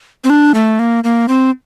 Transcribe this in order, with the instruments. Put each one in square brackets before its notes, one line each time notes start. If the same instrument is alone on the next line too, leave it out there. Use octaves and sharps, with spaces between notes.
[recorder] C4
D4
A3
A#3
A#3
C4